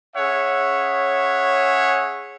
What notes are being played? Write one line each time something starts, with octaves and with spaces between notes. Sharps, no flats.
C#4 G#4 C#5 E5 F#5